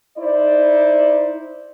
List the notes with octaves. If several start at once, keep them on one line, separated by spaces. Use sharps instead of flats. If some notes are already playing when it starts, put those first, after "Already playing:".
D#4 E4 C5 D5